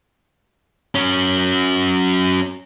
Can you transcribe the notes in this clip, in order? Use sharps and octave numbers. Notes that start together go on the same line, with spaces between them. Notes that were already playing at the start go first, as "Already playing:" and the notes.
F#3 C#4